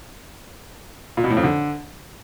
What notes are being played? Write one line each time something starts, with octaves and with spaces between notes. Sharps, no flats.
A#2
B2
A2
F2
D3